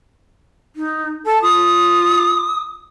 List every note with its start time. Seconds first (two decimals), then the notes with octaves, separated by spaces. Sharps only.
0.76 D#4
1.26 A4 A5
1.43 F4 D#6